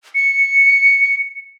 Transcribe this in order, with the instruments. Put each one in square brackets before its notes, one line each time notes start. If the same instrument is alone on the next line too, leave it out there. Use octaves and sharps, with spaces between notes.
[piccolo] C#7